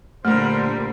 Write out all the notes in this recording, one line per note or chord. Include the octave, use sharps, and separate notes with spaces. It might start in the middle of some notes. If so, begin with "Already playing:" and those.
A#2 D3 G3 A3 A#4 C5